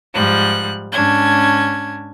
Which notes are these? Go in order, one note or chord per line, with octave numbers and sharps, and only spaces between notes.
G#2 F3 G3 F#6
G#2 C#4 D4 G#6